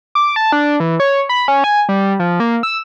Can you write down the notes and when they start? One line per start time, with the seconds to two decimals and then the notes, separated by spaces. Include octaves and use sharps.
0.15 D6
0.36 A5
0.52 D4
0.80 E3
1.00 C#5
1.29 B5
1.48 C#4
1.64 G#5
1.89 G3
2.20 F3
2.40 A#3
2.63 E6